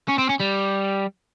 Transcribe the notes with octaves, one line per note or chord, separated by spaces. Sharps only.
C#4
C4
C#4
G3